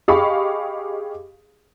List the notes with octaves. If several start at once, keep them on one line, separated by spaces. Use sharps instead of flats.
G4 G#4 D#5 F5 B5 C#6